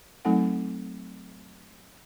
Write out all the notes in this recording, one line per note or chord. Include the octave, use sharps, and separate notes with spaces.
F#3 A3 C4 D#4 A4 F#5